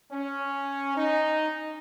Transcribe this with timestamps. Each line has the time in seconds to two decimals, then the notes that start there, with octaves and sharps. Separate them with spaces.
0.11 C#4
0.96 D#4